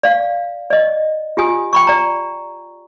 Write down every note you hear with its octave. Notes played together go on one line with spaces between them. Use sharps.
D5 F5
D5 D#5
F4 G4 G#5 D#6
G5 B5 C#6
D5 A#5